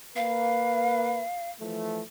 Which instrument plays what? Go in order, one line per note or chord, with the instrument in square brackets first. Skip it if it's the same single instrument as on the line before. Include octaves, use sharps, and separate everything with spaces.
[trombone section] A#3 B4 [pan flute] F5
[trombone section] E3 F3 A3